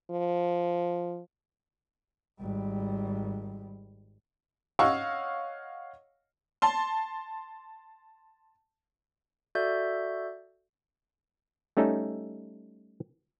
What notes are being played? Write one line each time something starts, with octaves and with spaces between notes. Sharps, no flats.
F3
G#1 G3
C#5 D#5 F5 F#5 C#6 E6
A5 C6
F#4 A4 D5 E5 G6
G3 A3 C#4 D#4 A4